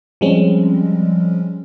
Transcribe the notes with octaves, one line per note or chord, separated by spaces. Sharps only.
F3 G3 G#3 C4 C#4